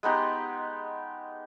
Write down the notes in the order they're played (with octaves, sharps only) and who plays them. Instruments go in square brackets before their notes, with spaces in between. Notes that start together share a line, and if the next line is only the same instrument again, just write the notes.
[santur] G#3 B3 D#4 G4